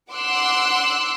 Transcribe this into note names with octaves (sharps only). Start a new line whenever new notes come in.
F#5 C6 D6 E6 F#6